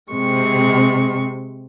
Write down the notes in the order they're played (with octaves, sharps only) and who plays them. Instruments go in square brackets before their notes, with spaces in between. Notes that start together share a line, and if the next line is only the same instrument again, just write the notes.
[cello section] C3 [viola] G#3 C#6